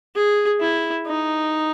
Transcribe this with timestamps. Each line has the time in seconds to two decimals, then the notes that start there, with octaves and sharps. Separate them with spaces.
0.15 G#4
0.60 E4
1.07 D#4